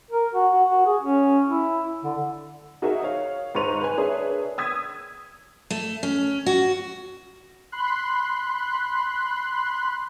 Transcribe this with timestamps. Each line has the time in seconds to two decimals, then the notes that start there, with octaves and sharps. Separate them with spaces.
0.10 A#4
0.34 F#4
0.51 F#4
0.68 F#4
0.86 G#4
1.01 C#4
1.48 E4
2.03 D3
2.82 D#4 F#4 G#4 A#4 D#5 E5
3.04 C#5 F5
3.55 G#2 B4 C5 C#6 D#7 F7
3.81 B4 G#5
3.97 D4 G#4 A#4 B4 C#5 E5
4.58 D#6 E6 G#6 B6
5.70 A3
6.03 C#4
6.46 F#4
7.72 B5 C6 F#6